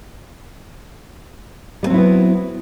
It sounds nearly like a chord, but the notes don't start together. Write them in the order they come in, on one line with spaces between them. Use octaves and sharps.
G3 C4 F#3 E4 B3